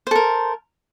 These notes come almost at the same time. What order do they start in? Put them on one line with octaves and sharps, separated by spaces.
C5 A4 A#4